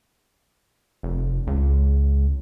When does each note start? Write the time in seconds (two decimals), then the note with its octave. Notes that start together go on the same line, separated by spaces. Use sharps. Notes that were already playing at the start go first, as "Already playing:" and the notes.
1.03 F1
1.47 C#2